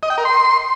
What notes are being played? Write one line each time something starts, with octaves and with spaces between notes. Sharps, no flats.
D#5
G5
A#4
C6